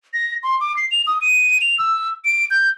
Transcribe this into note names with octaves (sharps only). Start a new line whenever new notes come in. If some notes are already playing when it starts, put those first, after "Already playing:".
A#6
C6
D6
C7
F7
D#6
D#7
F7
E6
D7
G6